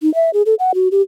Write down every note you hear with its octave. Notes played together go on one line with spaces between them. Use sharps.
D#4
E5
G#4
A4
F#5
F#4
G4